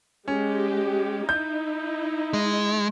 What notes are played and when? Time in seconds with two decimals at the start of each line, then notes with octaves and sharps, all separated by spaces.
0.28 G#3 C#4 G4
1.29 D#4 E4 G6
2.33 G#3